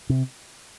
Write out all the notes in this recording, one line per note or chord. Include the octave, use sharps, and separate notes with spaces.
C3